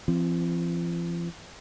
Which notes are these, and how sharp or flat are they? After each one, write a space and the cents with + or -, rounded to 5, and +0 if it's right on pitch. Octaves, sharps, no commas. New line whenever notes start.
F3 -40 C4 +0